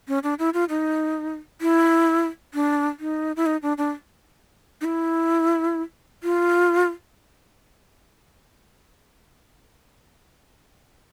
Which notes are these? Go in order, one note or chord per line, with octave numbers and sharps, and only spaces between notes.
C#4
D4
E4
F4
D#4
E4
D4
D#4
E4
D#4
D4
D4
D#4
E4
F4